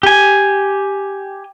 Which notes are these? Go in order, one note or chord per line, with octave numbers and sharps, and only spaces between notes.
G4 G#5